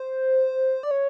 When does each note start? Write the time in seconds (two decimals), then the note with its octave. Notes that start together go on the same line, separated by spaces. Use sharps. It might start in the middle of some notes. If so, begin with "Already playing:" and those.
Already playing: C5
0.83 D5
0.91 C#5